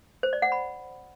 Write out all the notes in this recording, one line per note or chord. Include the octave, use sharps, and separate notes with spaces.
C5
D5
F#5
B5